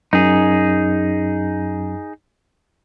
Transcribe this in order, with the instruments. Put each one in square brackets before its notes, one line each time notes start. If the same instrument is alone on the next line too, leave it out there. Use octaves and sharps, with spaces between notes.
[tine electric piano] F#2 [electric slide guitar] D#4 G#4